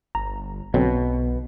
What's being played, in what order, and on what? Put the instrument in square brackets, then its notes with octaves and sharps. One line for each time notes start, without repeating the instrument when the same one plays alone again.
[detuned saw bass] G1 [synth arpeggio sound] A#5
[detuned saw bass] B1 [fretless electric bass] B2 [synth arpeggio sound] D3 F#3 C4